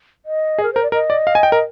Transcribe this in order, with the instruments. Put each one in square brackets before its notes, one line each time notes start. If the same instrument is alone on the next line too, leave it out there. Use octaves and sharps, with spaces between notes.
[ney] D#5
[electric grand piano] G#4
[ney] A#4
[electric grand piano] A#4 [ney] C5
[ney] D5
[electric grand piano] A#4 [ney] D#5
[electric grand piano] D5
F5
G#5
G5
A#4